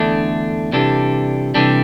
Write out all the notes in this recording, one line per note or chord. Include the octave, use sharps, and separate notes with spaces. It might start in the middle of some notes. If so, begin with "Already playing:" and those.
Already playing: E2 D3 A3 D4
C3 E3 G3 D4 A4
C3 E3 G3 D4 A4